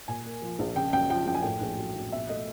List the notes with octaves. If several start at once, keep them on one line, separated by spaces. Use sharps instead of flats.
A#2 G#5
A#3
F3
A#1
C#3 G5
F#2 G5
F3 G5
F#2 G5
G#5
A2 G5
A#1
F#3
A#1
B2 E5
A3 D#5